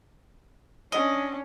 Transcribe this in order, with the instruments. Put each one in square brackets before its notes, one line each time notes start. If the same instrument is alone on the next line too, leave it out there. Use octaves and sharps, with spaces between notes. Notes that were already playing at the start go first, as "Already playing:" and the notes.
[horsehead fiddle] C#4 D4 [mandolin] D#5